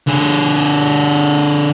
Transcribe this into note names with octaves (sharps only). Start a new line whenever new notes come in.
D3 G#4